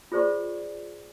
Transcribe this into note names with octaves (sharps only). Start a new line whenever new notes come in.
F4 G#4 C5 D5 C#6